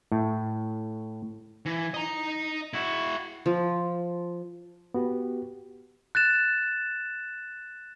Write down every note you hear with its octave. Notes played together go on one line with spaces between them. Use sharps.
A2
E3
D#5 A#5
E4 F#4
F3
B3 F#4 G4
F#6 A6 E7